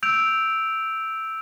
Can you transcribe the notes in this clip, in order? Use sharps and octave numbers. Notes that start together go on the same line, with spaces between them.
E6 G6 D7 F7